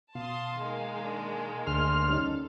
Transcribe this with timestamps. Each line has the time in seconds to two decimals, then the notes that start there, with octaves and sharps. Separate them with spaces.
0.15 B2 F5 A5 C6 D#6
0.61 D#3 G#3 A#3
1.04 D4
1.67 D2 G#4 C6 F6
2.08 G3 C#4 D#4 A4